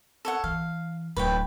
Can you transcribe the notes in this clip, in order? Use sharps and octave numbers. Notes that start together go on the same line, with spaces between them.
A4 C#5 F#5
E3 F5
D1 B4 C#5 G5